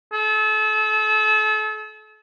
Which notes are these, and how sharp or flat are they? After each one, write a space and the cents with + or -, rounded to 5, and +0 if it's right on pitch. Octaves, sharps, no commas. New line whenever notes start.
A4 -35